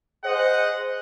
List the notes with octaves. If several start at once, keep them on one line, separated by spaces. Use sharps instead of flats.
G#4 C5 D#5 F#5